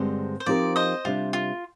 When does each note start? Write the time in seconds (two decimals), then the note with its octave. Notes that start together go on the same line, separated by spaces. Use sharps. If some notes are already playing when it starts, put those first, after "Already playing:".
Already playing: G2 D3 G#3 C4 G4 C5
0.40 C5
0.46 F3 C4 D#4 G4 A#4 D5
0.76 C5 D#5
1.05 C3 G3 D4 F4
1.33 F4